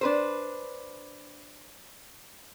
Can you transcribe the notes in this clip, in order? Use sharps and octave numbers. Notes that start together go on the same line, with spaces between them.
D4 B4 C5